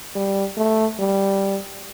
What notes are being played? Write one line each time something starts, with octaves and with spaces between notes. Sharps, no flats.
G3
A3
G3